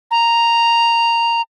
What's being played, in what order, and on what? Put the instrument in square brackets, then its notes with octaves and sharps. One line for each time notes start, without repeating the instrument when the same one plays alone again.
[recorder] A#5